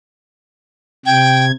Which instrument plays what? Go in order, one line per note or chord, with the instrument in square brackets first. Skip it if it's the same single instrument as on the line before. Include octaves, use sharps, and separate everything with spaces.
[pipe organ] C3 G#6 [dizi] G5